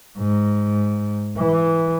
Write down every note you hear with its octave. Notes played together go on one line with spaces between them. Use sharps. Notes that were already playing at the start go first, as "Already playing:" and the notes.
G#2
E3